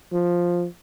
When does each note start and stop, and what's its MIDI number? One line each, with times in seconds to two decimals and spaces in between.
0.13 0.66 53